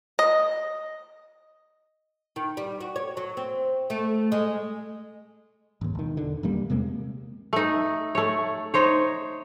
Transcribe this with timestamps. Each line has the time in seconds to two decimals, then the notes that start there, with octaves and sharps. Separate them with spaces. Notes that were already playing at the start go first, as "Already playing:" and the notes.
0.19 D#5
2.36 D#3
2.57 G3
2.80 F#4
2.96 C#5
3.17 F#3
3.37 C4
3.90 A3
4.32 G#3
5.81 G#1 D#2
5.95 E1 D#3
6.17 D3
6.43 D#1 E2 G3 A#3
6.70 C3 G#3 A#3 C4
7.53 A3 D#4
8.15 A3 C#5
8.74 D#4 C5 C#5